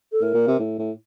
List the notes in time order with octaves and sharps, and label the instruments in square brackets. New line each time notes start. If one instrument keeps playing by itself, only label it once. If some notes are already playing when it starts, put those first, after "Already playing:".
[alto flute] A4
[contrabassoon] A2 [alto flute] A#4
[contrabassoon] A#2
C3
A2
A2